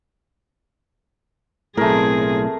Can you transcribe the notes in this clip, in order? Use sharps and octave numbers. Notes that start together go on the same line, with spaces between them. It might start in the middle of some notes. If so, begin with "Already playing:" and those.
B1 A2 A3 C4 G#4 A#4